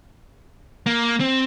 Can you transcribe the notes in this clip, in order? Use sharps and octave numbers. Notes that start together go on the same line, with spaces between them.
A#3
C4